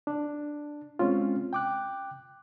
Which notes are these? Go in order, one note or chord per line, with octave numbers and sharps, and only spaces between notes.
D4
G#3 C4 C#4 F4
G5 D6 F#6